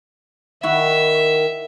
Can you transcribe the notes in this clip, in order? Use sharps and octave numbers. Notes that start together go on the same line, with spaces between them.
D#3 E4 F#4 E5